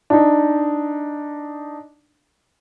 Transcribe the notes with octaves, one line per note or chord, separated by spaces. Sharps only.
D4 D#4